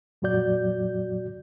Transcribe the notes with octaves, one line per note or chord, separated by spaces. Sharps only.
F2 A#2 F#3 F#4 D5 G6